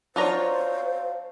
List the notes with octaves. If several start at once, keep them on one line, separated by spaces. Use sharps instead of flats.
F#3 D4 F4 C5 C#5 A#5